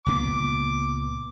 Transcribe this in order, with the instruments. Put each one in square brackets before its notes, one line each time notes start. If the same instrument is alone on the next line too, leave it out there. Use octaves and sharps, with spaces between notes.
[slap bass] C#2 A#2 B3 [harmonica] D6